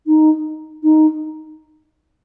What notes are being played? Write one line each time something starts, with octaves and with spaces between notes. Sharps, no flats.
D#4
D#4